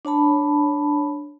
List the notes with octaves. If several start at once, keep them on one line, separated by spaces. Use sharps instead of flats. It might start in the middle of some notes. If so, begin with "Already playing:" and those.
D4 C#5 A5 B5